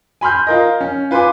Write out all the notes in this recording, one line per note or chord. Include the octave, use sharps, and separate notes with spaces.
G#5 B5 C6 F6 G6
F4 A#4 D#5
C#4
F4 B4 G#5 C6 D6